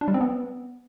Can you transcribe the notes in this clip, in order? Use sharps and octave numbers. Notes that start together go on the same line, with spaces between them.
D4
G3
C4
B3